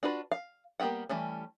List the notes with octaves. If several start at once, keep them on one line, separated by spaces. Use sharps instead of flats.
D4 F4 F#4 B4
F5
G3 A#3 B3 G4 F#5
E3 G3 A3 C#4